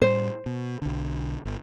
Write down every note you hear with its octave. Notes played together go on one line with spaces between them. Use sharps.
A2 G3 C5
B2
B1 D3
G1